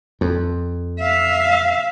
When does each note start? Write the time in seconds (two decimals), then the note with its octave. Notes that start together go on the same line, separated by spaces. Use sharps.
0.21 F2
1.00 E5 F5